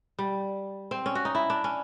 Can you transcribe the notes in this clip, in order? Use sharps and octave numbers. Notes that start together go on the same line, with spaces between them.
G3
C4
C#4
F#4
D#4
E4
D4
C#4